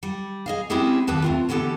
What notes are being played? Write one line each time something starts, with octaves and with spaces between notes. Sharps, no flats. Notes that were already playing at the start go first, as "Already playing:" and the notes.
G3
G#4 D#5 F5
G#3 C4 C#4 E4 G4 G#4
D#2 G4 B4 A5
A3 C4 F4
D3 E3 B3 G4 A4